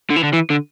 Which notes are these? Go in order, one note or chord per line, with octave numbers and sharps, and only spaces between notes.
D3
E3
D3
E3
D3